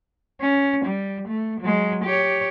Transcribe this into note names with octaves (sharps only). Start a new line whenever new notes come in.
C#4
G3
A3
F#3 G#3
G4 C#5